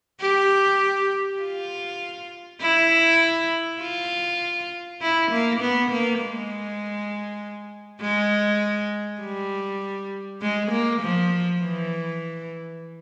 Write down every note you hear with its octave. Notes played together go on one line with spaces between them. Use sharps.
G4
F4
E4
F4
E4
A#3
B3
A#3
G#3
G#3
G3
G#3
A#3
F3
E3